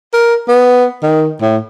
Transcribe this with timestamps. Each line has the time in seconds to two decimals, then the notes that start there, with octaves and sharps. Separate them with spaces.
0.13 A#4
0.48 B3
1.02 D#3
1.41 A2